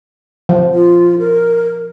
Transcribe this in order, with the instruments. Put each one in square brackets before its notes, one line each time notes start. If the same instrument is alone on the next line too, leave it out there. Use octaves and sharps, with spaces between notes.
[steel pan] F3
[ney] F4
A#4